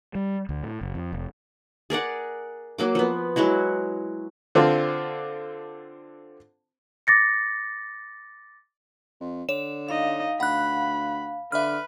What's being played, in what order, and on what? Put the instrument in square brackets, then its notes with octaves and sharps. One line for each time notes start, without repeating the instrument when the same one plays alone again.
[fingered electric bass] G3
D2
A2
F#1
F2
F1
[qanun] G#4 A#4 D5 F#5
F#3 A#3 D6
F3 B3
F#3 G#3 E4 F#4
[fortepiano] D3 C4 D4 F4
[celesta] D6 A6 A#6 C#7
[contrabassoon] F2
[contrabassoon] D3 [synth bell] C#5 E7
[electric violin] D#4 D#5 [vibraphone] F5
[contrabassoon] D2 [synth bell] F#5 F#6 [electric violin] B5
[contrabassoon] D3 [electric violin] B4 [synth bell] E5 F6